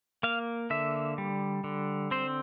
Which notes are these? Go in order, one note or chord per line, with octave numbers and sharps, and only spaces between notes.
A#3 F5
D3 E5
G3
D3
C4 C5